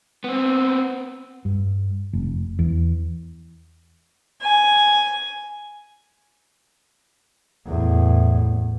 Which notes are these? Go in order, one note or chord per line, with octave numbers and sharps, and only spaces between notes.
B3 C4
G2
F1
E2
G#5
E2 A2